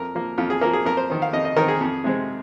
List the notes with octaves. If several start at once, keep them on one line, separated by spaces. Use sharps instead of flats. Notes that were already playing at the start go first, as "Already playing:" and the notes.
Already playing: F2 A#4
F3 A#3
F2 F4
G#4
F3 A#3 A#4
G#4
F2 A#4
C5
D#3 C4
F5
F2 D#5
D#5
D#3 C4 A#4
G#4
F2
C3 G#3 C4